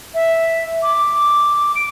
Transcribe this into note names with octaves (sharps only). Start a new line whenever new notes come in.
E5
D6
D7